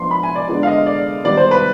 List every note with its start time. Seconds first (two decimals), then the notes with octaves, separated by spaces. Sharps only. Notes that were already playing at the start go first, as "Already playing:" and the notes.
Already playing: F3 B3 D4 C6
0.11 B5
0.23 G#5
0.35 D5
0.48 D3 G#3 B3 D5
0.63 F5
0.67 D#5
0.86 D5
1.24 D#3 G3 B3 D5
1.37 C5
1.51 B4